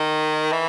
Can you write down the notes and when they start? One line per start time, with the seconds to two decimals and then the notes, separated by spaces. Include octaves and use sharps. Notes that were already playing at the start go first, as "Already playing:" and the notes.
Already playing: D#3
0.52 E3